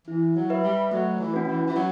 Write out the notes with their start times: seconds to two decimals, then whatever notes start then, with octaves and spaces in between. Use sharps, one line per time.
0.08 E3 E4
0.36 F#3
0.50 B4 E5
0.64 G3
0.91 F#3 A3
1.19 E3
1.33 C#4 F#4 B4
1.47 E3
1.67 E3
1.75 F#3 F#4